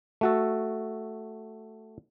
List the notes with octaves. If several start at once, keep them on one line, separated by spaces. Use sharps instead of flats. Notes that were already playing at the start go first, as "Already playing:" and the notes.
A3 F#4 A4